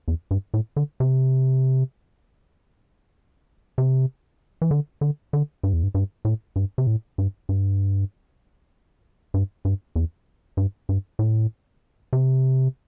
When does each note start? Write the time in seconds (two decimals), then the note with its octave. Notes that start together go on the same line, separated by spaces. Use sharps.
0.08 E2
0.31 G2
0.54 A2
0.76 D3
1.00 C3
3.78 C3
4.62 E3
4.71 D3
5.01 D3
5.33 D3
5.63 G2
5.73 E2
5.83 G2
5.95 G2
6.25 A2
6.56 G2
6.78 C3
6.87 A2
7.18 G2
7.49 G2
9.34 G2
9.65 G2
9.96 E2
10.57 G2
10.89 G2
11.19 A2
12.13 C3